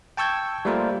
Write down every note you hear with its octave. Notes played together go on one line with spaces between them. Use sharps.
G5 A5 C#6 E6 G6 G#6
G3 A3 A#3 F4 A#4 C5